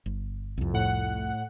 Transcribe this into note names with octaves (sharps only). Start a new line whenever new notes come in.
G1
C2 F2
A2 F#5